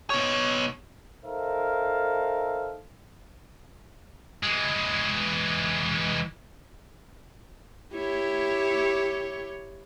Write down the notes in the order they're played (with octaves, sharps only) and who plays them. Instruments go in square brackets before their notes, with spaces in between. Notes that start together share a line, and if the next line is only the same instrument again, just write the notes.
[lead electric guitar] B2 C#5
[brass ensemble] D#4 A4 A#4 C5 E5 F5
[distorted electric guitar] E3 G#3
[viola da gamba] E4 G4 C#5